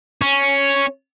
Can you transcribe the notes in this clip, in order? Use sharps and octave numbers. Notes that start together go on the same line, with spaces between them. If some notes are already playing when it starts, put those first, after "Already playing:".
C#4